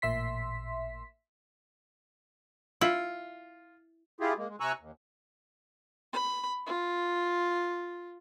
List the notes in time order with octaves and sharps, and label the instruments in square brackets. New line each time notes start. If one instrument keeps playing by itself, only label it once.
[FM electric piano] A1 A#2 E5 C6 B6
[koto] E4 [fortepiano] F4
[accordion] E4 F4 G4 G#4
G#3 A#3
G#3
C3 G#5 A#5 C#6 E6 F#6
D#2
[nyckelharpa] B5
F4